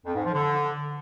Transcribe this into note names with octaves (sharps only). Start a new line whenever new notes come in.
F2
G#2
F3
D3